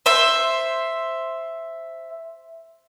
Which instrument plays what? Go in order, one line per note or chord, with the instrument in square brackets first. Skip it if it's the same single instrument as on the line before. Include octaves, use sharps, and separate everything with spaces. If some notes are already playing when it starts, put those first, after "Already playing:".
[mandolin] C5 E5